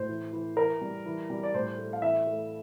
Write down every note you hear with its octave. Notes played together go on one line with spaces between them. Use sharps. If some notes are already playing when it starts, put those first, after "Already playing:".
Already playing: A2 C5
E3
E3
E3 A#4
G3
E3
G3
D5
A2 C5
A3
F5
E3 E5
A3